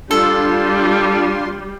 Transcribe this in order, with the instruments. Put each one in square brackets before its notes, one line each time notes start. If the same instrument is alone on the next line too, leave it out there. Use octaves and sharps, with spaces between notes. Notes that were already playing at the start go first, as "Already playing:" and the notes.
[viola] G3 [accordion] D4 F4 C6 [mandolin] A4